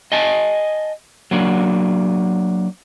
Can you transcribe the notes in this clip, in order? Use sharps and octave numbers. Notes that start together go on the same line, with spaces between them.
D#5 G#5 A5
F#3 A#3 D4